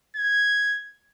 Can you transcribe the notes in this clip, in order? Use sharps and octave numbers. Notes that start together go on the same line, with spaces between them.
G#6